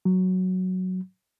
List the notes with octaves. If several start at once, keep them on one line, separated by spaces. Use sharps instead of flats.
F#3